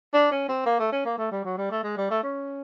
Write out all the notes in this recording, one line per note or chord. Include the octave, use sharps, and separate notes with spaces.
D4
C#4
C4
A#3
A3
C#4
A#3
A3
G3
F#3
G3
A3
G#3
G3
A3
C#4